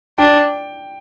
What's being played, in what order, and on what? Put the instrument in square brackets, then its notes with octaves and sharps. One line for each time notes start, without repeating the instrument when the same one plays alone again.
[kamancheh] D4 [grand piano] G5